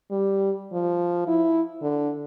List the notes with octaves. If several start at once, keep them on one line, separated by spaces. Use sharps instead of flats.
G3
F3
E4
D3